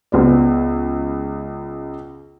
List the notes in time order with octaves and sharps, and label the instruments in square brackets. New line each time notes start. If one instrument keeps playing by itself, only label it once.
[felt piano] C#2 B3 D5